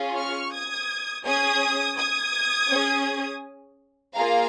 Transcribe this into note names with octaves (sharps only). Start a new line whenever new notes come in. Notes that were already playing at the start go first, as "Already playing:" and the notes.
Already playing: C#4 F4 G#4
C#6 F6
D#6 G#6
C#4 G#4 D#6 G#6
D#6 G#6
C#4 G#4
A#3 F4 G#4 F5 A#5